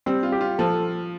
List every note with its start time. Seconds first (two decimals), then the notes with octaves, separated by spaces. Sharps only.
0.06 G3 C4
0.23 F4
0.32 G4
0.41 F4
0.58 F3 A4